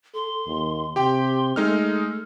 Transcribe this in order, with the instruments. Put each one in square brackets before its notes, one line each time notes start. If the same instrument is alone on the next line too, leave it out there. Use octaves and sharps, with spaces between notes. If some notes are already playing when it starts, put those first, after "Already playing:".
[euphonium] A4 [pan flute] C6
[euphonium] D#2
[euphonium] C3 [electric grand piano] G4 G5 [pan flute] C6
[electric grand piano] G#3 D#4 F6 [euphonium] A3 [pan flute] A4